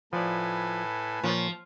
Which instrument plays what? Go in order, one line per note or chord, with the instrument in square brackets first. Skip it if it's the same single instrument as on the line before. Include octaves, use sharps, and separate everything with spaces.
[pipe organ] A2 A4 [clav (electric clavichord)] F3 D5 [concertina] B4 G#5
[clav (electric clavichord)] A#2 C#5 [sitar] F3